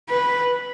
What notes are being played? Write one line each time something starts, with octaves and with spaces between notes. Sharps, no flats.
B4